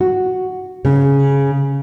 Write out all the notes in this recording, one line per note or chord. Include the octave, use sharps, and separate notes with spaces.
F#4
C#3